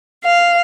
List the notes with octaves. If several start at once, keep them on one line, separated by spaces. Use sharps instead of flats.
F5